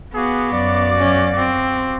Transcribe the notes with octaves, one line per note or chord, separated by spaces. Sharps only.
B3 F#4 G#4 F5 D6
F#2 D5
C#4
C4